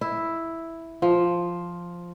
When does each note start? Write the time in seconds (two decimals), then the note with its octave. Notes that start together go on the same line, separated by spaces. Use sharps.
0.01 E4
1.02 F3